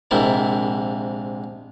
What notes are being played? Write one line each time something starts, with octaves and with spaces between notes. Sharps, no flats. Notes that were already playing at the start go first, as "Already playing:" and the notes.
A#1 G#2 C3 A#3 E4 A#4